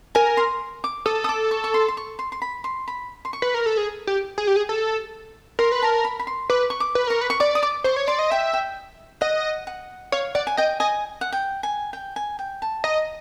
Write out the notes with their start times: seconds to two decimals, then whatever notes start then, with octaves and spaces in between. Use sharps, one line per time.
0.15 A#4 G#5
0.37 C6
0.84 D6
1.06 A4 D#6
1.24 D#6
1.29 D6
1.51 C#6
1.64 C#6
1.74 C6
1.88 C6
1.97 C#6
2.19 C6
2.32 C6
2.42 B5
2.64 C6
2.88 B5
3.25 C6
3.33 C#6
3.42 B4
3.54 A#4
3.66 A4
3.77 G#4
4.07 G4
4.38 G#4
4.47 G4
4.56 G#4
4.69 A4
5.59 A#4 C6
5.72 B4
5.82 A#4 A5
6.05 B5
6.19 B5
6.27 C6
6.50 B4 D6
6.70 C#6
6.80 D6
6.95 B4
7.07 A#4 C#6
7.21 B4
7.30 C#6
7.40 D5 D6
7.55 D#6
7.63 D6
7.84 C5 C#6
7.96 C#5
8.07 D5 C6
8.19 D#5
8.30 E5 G5
8.53 G5
9.21 D#5 F#5
9.67 F#5
10.12 C#5 F5
10.35 D5 F#5
10.47 G#5
10.57 D#5 G5
10.80 D#5 G#5
11.21 F#5
11.32 G5
11.63 G#5
11.93 G5
12.16 G#5
12.39 G5
12.62 A5
12.84 D#5 A#5